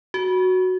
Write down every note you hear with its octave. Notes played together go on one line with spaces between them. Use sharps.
F#4